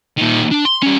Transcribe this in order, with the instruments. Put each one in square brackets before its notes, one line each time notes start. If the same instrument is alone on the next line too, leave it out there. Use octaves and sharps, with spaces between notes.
[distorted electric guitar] A#2 D#3
D4
C6
G3 C#4